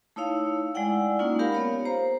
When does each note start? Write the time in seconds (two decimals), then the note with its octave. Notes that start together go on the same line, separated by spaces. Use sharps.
0.16 A3 D#4 E4 C#5 F5
0.75 G#3 E4 D5 F#5 G5
1.19 A#3 C#4 D#4 F4
1.39 G4 A#4 F5 B5
1.52 B3 C#5 F5
1.85 C5 A#5